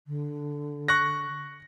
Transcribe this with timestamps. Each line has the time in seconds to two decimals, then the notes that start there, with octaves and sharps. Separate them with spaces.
0.07 D3
0.88 C#6 F#6 A#6